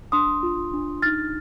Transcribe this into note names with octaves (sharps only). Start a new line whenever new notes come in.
D4 C6 D#6
F4
D4
D#4 F6 A6